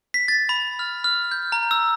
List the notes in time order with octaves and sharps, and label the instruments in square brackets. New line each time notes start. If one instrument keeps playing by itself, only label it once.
[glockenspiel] B6
A6
B5
F6
F6
G6
A#5
E6